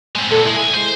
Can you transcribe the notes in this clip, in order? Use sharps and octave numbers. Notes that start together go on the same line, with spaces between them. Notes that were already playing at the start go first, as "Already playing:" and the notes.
G#3 C4
A#2 A4
G#3 E4
C2 G#5
G#3 C5